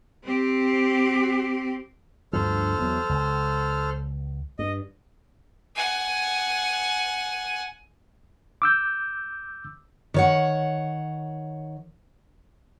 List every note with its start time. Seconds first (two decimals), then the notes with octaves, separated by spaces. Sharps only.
0.24 C4 G4
2.33 D2 G2 F3 A4 C5 F6
2.78 E2 F3 F#3
3.09 C#2
4.59 G2 D#5
5.76 F#5 G#5
8.62 D6 E6 G6
10.14 D#3 C#5 F#5